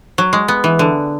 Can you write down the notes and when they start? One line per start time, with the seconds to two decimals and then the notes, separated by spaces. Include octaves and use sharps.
0.18 F#3
0.33 G#3
0.48 B3
0.64 E3
0.79 D3